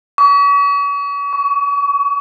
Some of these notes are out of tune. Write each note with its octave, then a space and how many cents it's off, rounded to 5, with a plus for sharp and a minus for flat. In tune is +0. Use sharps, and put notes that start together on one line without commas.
C#6 +40
C#6 +15